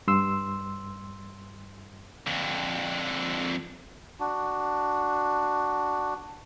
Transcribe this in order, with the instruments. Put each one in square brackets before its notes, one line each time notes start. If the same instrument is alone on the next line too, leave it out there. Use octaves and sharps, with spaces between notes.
[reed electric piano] G2 C6 E6
[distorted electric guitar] F2 D3
[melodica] D4 F#4